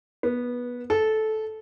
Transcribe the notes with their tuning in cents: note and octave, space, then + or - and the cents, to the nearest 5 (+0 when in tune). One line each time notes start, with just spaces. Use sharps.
B3 -15
A4 -15